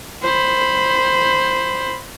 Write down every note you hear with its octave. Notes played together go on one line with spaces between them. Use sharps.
C5 B5